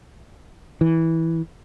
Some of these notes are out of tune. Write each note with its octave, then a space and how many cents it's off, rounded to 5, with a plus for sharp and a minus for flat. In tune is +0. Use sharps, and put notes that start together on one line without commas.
E3 -10